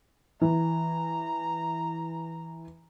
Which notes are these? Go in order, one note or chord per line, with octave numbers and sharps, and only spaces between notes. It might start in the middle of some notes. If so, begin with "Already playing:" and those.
E3 A#5